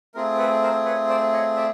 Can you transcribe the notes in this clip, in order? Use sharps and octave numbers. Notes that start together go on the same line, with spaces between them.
A3 C4 F4 G#4 A#4
A4 B4
A#4 C5
B4 C#5
C5 D5
C#5 D#5
D5 E5